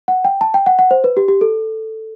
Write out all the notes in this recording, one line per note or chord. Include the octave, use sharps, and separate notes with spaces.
F#5
G5
A5
G5
F#5
F#5
C5
B4
G4
G4
A4